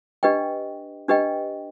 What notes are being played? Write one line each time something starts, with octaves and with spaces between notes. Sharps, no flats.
D4 G4 B4 D#5 G5
D4 G4 B4 D#5 G5